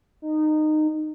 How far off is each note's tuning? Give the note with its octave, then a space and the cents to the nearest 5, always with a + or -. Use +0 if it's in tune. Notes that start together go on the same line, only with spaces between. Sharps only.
D#4 -20